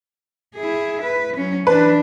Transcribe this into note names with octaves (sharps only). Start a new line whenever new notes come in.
E4 G#4
B4
F#3 C#4
E3 D4 B4